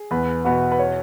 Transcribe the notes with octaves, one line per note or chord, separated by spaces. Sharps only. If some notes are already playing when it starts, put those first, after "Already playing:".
Already playing: G#4
E2 B4
B2 B3 F#4
B4
C#5